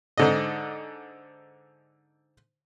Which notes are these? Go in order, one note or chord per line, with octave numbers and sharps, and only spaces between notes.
G#2 D3 D#5